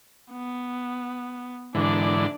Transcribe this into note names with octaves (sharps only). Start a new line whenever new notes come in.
B3
G#2 D3 E3 D4 D5